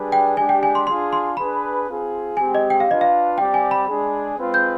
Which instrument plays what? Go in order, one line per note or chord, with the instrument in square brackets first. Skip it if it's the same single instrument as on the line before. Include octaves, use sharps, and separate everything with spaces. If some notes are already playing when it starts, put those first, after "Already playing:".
Already playing: [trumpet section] G3 D4 G#4 B4
[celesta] G5
[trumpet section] G#3 D4 G4 [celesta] G#5
[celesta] G5
G#5
C6
[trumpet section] D4 F4 G#4 [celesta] C6
[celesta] C6
[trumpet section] D4 G#4 B4 [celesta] B5
[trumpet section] C4 F4 G#4
[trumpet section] G#3 C4 G4 [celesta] G#5
[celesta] D#5
G5
F5
[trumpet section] D4 F4 B4 [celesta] D#5
[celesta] F5
[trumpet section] G3 C4 G4 D5 [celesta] G5
[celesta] G#5
B5
[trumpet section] G#3 D4 G#4
G#3 C4 F4 B4
[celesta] G6